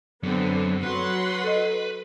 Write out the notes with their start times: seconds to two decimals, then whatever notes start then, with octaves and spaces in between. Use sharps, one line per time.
0.23 F#2 D3 B3 C4
0.83 F#3 B4 F#5 C6
1.43 A4 D#5